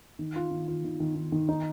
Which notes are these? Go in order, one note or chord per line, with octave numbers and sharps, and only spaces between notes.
D#3
F4
D#3
F4
D#3
D#3
D#3
D#3
D#4